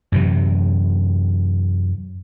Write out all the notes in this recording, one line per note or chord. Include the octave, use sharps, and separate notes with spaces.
F#2 C3 E3